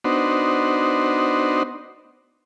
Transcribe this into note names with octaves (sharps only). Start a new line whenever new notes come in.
B3 D4 D#4 F#4 C5